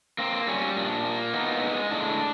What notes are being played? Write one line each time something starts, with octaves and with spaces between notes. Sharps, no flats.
A#3 C4
G3 C#4
A#2 D4
A#3
B3 D#4
G#3
A2 D4